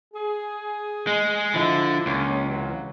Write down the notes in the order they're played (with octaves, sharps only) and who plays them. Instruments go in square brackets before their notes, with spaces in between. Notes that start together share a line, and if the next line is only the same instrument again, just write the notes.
[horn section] G#4
[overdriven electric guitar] G#3
[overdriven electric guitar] D3 [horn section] F3 E4
[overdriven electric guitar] C#2 [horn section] A#3 C#4
[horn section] C3 E3 F#3